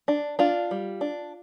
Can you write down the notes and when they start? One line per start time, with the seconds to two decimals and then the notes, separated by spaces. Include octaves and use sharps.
0.08 D4
0.39 D4 F4
0.71 G3
1.01 D4